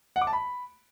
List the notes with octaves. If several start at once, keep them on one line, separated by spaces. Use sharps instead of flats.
F#5
D6
A5
B5